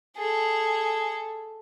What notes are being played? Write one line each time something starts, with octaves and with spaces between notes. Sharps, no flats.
G#4 A4